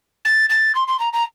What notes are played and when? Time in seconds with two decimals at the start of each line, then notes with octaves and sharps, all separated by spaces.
0.25 A6
0.49 A6
0.75 C6
0.88 C6
0.99 A#5
1.13 A#5